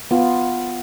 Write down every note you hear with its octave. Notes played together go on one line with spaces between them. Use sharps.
B3 F4